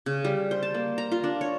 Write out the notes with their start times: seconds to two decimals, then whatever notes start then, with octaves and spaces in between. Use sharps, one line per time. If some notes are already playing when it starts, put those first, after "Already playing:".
0.06 C#3
0.24 G3
0.51 C5
0.63 A5
0.74 A#3
0.98 A#5
1.12 F4
1.24 D4
1.41 C#5